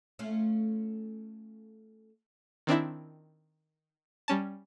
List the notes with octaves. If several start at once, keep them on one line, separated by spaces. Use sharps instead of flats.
A3 C#4 F4
D#3 C4 D4 E4
G3 C#4 A5